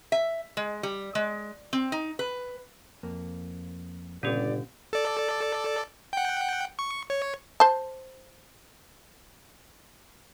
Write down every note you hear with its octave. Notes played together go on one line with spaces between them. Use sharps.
E5
G#3
G3
G#3
C4
D#4
B4
F2 A#3
G1 A#2 C#3 C#4 D4 G4 D5
A4 D5
F#5 G5
C#6
C#5
C5 A5